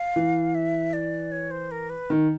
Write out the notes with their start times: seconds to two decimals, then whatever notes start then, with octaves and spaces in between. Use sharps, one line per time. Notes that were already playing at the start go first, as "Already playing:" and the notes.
Already playing: F5
0.16 E3
0.55 E5
0.93 D5
1.32 C#5
1.51 C5
1.71 A#4
1.90 B4
2.10 D#3